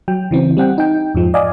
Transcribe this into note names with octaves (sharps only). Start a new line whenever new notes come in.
F#3 G5
C#3 E3 C4
G3 C4 F#5 G5
D#4 G5
F2 G#2 F3 G#3
D5 D#5 F5 G#5